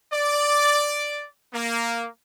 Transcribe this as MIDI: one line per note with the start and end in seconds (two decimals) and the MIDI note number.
0.13 1.26 74
1.54 2.08 58